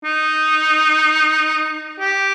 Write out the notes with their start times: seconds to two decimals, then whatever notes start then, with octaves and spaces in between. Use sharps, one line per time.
0.04 D#4
2.00 G4